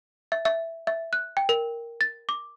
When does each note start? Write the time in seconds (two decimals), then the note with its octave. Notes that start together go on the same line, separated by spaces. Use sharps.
0.32 E5
0.45 E5
0.87 E5
1.13 F#6
1.37 G5
1.49 A#4
2.01 A6
2.29 D6